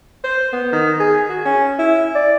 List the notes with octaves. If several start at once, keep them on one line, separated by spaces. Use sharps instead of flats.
C5
B3
D#3
G#4
F#4
C#4
E4
D5